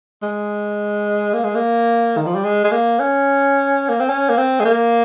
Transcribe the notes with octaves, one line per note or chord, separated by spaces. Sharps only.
G#3
A#3
G#3
A#3
D#3
F3
G3
G#3
G#3
A#3
C#4
A#3
C4
C#4
A#3
C4
G#3
A#3